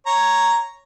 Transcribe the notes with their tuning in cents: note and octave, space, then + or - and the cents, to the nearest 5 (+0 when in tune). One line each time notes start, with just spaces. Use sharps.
C#5 +0 A#5 +0